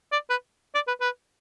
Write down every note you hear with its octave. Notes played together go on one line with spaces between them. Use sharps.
D5
B4
D5
B4
B4